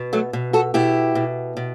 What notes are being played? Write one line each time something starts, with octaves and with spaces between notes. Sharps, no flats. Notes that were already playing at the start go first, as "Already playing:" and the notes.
Already playing: B2
F#3 A3
B2
F#4 A4
B2 E4 G4
B2
B2